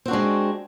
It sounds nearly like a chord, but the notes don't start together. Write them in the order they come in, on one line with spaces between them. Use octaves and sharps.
C4 F#4 D4 G#3